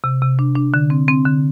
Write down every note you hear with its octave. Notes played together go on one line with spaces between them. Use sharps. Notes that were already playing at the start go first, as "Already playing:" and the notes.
C3
C3
D4
D4
D3
C4
C4
D3